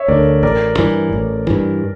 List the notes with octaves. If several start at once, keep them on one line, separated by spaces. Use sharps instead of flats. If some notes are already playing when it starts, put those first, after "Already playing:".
Already playing: C#5 E5
D2 D3 A#4 D5
A1 A#4 D5
G2 E3
A1
G2 E3